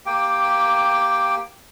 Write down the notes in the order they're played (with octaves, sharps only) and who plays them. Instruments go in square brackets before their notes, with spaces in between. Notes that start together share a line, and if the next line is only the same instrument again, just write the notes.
[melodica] A#3 G4 G5